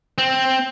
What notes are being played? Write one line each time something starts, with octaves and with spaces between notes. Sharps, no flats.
C4